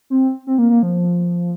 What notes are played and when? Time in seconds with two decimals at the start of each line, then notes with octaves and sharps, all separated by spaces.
0.10 C4
0.47 C4
0.58 A#3
0.70 A#3
0.83 F3